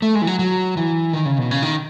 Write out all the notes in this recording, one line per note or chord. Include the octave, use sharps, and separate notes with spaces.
A3
G#3
E3
F#3
F#3
E3
D#3
C#3
B2
C#3
D#3